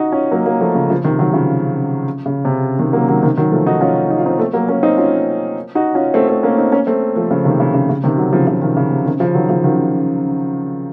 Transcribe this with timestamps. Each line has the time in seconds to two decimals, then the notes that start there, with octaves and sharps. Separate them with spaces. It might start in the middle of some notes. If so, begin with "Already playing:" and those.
Already playing: D#4 F#4
0.12 C#4 F4
0.31 F#3 A#3
0.46 F#3 A#3
0.61 F3 A3
0.75 C#3 F3
0.90 C#3 F3
1.04 C3 D#3
1.19 D#3 F#3
1.33 C#3 F3
2.26 C#3
2.45 C3
2.79 C3 D#3
2.93 F#3 A#3
3.08 D#3 F#3
3.23 C3 D#3
3.37 D#3 F#3
3.52 F3 A3
3.66 D#4 F#4
3.81 C#4 F4
4.10 D#4
4.18 F4
4.26 C4 D#4
4.39 A3 C4
4.53 F#3 A#3
4.68 A#3 C#4
4.83 C4 D#4
4.98 C#4 F4
5.75 D#4 F#4
5.95 C#4 F4
6.14 A3 C4
6.29 A3 C4
6.43 A#3 C#4
6.58 C4 D#4
6.72 A#3 C#4
6.87 A3 C4
7.16 F3 A3
7.31 C#3 F3
7.45 C3 D#3
7.60 C#3
7.74 C#3
7.89 C#3
8.04 C3 D#3
8.18 D#3 F#3
8.33 C#3 F3
8.47 C#3 F3
8.62 C3 D#3
8.77 C#3
8.91 C3
9.06 C3 D#3
9.20 C#3 F3
9.35 D#3 F#3
9.49 C#3 F3
9.64 D#3 F#3